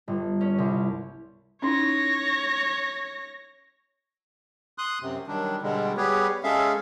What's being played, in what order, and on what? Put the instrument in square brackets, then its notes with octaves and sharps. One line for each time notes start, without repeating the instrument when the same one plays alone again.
[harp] G1
C#4
C2
[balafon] C#4 D#4 E4 [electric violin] C#5 A#6
[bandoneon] C6 D#6 F#6
F#2 C3
D#3 F#3 G3 D4
B2 D3 G3 G#3
G3 B3 G4 G#4 B4 C#5
G#3 C#4 G#4 A4 E5 F5